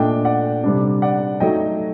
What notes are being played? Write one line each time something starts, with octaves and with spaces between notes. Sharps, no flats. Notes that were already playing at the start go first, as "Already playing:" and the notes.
Already playing: A#2 A3 D4 D#5 G5
D5 F#5
C3 G3 D4
D5 F#5
F#3 A3 D#4 D#5 G5